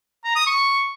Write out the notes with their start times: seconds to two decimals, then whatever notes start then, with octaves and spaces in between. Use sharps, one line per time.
0.24 A#5
0.35 D#6
0.47 C#6